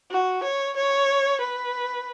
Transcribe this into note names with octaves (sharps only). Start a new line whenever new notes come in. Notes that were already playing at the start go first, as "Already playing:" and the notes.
F#4
C#5
C#5
B4